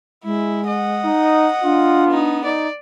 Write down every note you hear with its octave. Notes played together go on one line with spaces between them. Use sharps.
G#3 E4
D#5 F#5
D#4
D4 F4
B3 D#4
D#4 D5